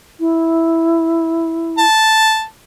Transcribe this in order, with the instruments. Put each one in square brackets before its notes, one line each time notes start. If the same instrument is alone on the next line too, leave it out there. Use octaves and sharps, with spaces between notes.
[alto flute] E4
[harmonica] A5